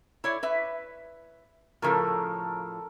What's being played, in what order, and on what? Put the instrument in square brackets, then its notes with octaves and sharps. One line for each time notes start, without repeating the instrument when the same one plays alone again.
[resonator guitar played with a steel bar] E4 C#5 D5
B4 E5
[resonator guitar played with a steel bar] A2 C#3 F3 [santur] A4 A#4